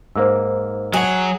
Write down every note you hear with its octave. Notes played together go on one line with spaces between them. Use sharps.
G#2 A#3 C5 E6
F#3 F#4 G#4